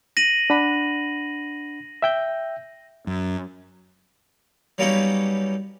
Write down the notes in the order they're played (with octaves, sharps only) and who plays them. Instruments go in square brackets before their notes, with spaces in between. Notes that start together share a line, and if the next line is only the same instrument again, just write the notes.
[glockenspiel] A#6 D#7 F#7
[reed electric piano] D4 F#5 B5
E5 G5 G6
[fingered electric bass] F#2
[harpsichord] F#3 G3 A#3 B3 C#4 D#4